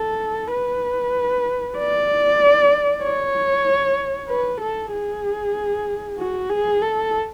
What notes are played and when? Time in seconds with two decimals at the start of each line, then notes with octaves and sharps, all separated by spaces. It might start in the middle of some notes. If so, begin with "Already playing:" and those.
Already playing: A4
0.51 B4
1.77 D5
3.03 C#5
4.29 B4
4.61 A4
4.92 G#4
6.19 F#4
6.50 G#4
6.82 A4